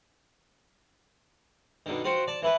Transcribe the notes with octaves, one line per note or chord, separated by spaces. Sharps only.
B2 D3 D#3
F4 F#4 C5 F#5 G5
D5 A5
E3 E4 B4